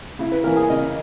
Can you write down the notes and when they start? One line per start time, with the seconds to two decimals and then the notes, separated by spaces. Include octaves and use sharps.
0.19 C#3 E4
0.32 B4
0.44 E3 A#3 C#4 A#4
0.57 G#4
0.70 C#3 D#5